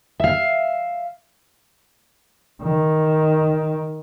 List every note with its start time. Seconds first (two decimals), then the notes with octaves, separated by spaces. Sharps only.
0.20 E5 F5
2.62 D#3